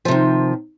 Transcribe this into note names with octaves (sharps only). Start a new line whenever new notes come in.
C3 D#3 F3